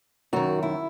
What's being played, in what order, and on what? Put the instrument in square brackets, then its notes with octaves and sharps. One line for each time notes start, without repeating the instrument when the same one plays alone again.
[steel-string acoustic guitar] F#2 D#3 F#4
E4